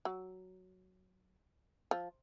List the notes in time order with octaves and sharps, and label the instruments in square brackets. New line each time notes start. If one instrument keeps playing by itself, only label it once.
[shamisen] F#3
F3